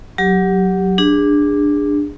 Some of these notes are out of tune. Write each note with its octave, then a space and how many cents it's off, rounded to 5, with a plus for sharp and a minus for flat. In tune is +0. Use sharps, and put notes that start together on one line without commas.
F#3 +0 G4 +0
D4 +5 G#4 -25